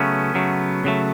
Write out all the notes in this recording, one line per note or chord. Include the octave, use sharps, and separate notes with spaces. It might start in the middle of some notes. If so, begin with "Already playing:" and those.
Already playing: C#3 F#3 A3 B3 C#4
C#3 F#3 A3
C#3 F#3 A3